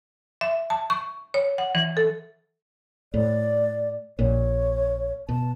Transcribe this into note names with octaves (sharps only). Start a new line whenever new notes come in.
E5
A5
C#6
C#5
F#5
E3
A4
A2 D5
A#1 A#2 C#5
B2 A5